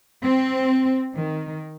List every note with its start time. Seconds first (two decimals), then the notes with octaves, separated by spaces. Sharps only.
0.23 C4
1.15 D#3